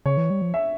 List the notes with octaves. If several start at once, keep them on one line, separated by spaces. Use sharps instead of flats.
C#3 C#5
E3
G3
F3
E5